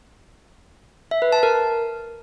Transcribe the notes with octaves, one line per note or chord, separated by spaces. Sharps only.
E5
B4
A5
A#4